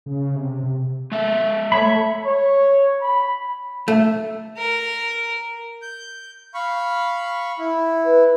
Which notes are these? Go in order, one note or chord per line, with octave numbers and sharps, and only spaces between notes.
C#3
C3
C3
G#3 E5
A3 C#5 E5 B5
C#5
B5
A3
A#4
G6
F5 B5 C#6
E4
B4